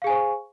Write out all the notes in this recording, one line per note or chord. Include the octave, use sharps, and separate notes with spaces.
G#4 C5 F5 G#5 C#6